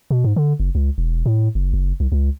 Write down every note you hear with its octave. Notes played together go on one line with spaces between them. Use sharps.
B2
G#2
D3
F#1
C#2
E1
A2
F#1
F#1
C2
C#2